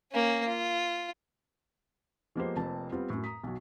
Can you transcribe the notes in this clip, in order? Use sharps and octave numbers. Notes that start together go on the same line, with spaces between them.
A#3 C#4
F4
F3 G#3 A#3 B3 G4 C5
F1 F2 A#3 C4 A5
G3 B3 C4 F4
F#2 A2
A#5 D#6 B6
B1 F#3